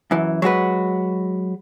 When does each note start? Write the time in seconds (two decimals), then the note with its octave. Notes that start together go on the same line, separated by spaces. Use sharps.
0.11 F#2 E3
0.42 F#3 G#3 F#4 B4